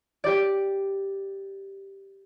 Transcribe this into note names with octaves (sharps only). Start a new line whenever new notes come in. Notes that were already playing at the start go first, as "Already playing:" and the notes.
G4 D5